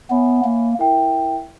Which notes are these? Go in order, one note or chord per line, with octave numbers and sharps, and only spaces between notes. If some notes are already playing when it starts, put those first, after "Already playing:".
B3 C#5 E5 G#5 B5
A#3
E4 A#4 E5 G5